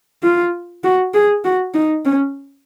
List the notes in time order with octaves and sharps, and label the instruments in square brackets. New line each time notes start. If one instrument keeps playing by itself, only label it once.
[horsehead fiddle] F4
F#4
G#4
F#4
D#4
C#4